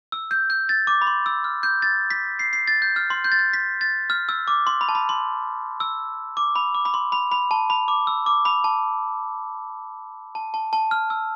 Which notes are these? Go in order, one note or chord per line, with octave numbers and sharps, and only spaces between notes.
E6
G6
G6
A6
D6
B5
C6
E6
F6
G6
A6
B6
C7
C7
A6
G6
F6
C6
G6
A6
G6
B6
A6
F6
E6
D6
C6
B5
A5
B5
C6
E6
D6
B5
D6
B5
C6
B5
B5
A5
B5
D6
E6
D6
B5
A5
A5
A5
A5
F6
E6